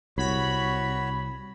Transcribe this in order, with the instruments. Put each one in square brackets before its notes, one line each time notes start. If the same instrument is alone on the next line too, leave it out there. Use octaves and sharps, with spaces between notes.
[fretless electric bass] C2 [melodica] F#4 C#5 [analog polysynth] B5